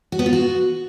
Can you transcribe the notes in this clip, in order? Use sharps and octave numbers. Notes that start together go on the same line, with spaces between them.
F#4
B3
F4
F#4